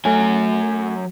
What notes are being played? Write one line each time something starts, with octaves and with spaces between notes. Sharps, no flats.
F#3 A3 C#5 G#5